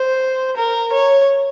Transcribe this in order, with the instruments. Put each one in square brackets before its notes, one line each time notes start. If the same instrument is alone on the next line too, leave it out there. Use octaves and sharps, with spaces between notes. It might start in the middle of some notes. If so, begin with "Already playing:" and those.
Already playing: [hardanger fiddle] C5
A#4
C#5